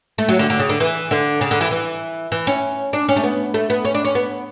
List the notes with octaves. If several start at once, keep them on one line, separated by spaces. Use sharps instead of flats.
A3
F#3
D3
D3
C#3
D3
E3
D3
C#3
D3
E3
E3
E3
C#4
D4
C#4
A3
B3
A3
B3
C#4
D4
C#4
B3